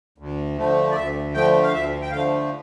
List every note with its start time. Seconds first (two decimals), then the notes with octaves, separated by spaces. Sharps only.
0.18 D2
0.57 D3 F3 A3
0.91 D5
0.95 D2 E5
1.34 D3 F3 A3 G5
1.63 F5
1.73 D2 E5
2.02 G5
2.11 D3 F3 A3 F5